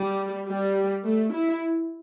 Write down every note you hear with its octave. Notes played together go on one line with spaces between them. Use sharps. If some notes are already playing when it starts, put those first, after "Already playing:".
Already playing: G3
G3
A3
E4